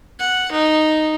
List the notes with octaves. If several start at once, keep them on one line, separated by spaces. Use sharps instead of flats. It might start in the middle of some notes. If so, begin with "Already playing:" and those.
F#5
D#4